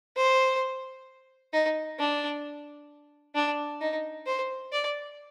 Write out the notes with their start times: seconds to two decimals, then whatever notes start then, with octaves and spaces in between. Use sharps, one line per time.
0.16 C5
1.53 D#4
1.99 D4
3.35 D4
3.81 D#4
4.26 C5
4.72 D5